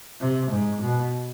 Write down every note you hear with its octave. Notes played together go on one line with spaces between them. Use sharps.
C3
G#2
B2